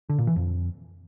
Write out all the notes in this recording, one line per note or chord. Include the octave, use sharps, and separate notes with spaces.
D3
A#2
E3
F2